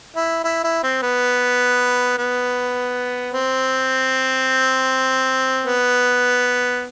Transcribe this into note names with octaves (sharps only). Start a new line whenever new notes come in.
E4
E4
E4
C4
B3
B3
C4
B3